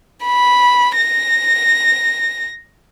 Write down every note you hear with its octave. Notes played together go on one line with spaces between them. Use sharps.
B5
A#6